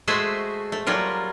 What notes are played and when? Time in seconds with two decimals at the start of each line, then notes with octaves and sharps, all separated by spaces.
0.07 G#3 A3 F#4 C5 E5 G#5
0.72 A3
0.87 F#3 G3 F4 A#4